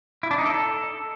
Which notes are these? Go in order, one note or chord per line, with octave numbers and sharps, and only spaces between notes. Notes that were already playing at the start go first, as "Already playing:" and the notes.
E4
D4
D#4
A4